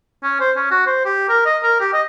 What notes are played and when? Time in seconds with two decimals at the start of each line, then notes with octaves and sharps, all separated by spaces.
0.23 C#4
0.40 C5
0.56 C#4
0.71 F#4
0.86 C5
1.05 G4
1.29 A#4
1.45 D#5
1.63 A#4
1.80 G4
1.93 D#5